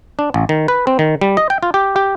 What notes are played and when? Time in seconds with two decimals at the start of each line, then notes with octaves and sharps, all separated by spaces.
0.19 D4
0.34 A1
0.49 D#3
0.68 B4
0.87 C4
0.99 D#3
1.21 G3
1.37 D#5
1.50 G5
1.63 F4
1.74 G4
1.96 G4